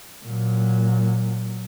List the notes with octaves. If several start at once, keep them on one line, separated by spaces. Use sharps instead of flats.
A#2 F#3